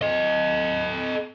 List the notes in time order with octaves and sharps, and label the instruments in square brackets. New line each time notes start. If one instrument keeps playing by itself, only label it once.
[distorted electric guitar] A4 D#5